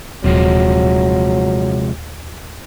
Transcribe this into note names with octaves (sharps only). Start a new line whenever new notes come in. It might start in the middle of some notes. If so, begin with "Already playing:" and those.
D#1 C3 F3 F#3 G#3